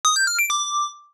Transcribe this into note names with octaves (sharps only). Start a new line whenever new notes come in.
D#6
G6
F6
D7
D6